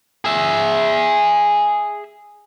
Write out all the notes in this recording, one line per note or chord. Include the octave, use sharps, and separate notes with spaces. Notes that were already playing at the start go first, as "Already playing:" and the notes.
G#4 E5